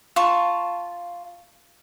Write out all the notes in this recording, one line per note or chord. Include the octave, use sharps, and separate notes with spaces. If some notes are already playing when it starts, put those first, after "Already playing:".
F4 A5 C#6